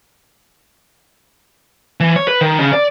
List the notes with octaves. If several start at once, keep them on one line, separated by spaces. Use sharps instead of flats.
E3
C#5
B4
D#3
C#3
D5